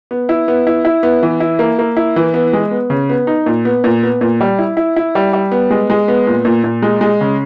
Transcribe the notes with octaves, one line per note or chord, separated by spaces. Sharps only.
B3
E4
B3
E4
E4
B3
E3
E4
A#3
A#3
E4
E3
B3
G#3
B3
C#3
B3
D#4
A#2
B3
A#2
B3
A#2
G3
E4
E4
E4
G3
G3
B3
G#3
G#3
B3
A#2
A#2
A#2
G#3
G#3
C#3